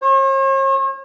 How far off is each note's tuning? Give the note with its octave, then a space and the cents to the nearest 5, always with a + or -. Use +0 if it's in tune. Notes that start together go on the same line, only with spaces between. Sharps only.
C#5 -45